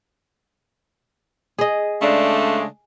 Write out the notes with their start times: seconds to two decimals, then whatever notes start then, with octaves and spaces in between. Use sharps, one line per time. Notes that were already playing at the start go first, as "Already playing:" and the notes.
1.58 G#4 D#5
2.02 C#3 G#3 A3 D4